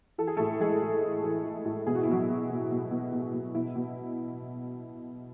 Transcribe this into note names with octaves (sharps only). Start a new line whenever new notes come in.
E3 A4
G#4
A2 A3 A4
E3 G#3 G#4
A2
E3
E3
E3
A2
B2 G#4
F#4
E4
B2 F#3 F#4
B2
B2
B2
B2
B2
B2
B2 E4
B2